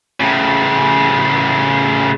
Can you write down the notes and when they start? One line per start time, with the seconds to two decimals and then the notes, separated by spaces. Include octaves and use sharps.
0.20 A2 C#3